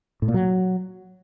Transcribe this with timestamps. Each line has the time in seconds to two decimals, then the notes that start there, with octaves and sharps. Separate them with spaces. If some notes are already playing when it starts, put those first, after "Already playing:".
0.22 A2
0.28 A#2
0.34 F#3